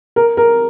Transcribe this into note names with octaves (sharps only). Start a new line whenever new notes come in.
A#4
A#4